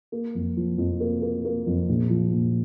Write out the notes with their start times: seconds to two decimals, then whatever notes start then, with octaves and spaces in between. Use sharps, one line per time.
0.12 A#3
0.35 F2
0.57 F3
0.78 F2
1.00 A#3
1.22 A#3
1.45 A#3
1.66 F2
1.89 A#1
2.10 F3
2.32 A#1